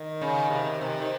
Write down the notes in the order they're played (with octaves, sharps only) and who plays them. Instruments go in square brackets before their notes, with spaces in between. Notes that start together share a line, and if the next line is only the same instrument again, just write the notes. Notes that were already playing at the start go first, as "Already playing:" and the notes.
Already playing: [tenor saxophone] D#3
[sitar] C#3
C3
C3
[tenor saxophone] D#3